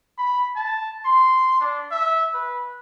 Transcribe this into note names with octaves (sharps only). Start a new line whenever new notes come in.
B5
A5
C6
D4
E5
B4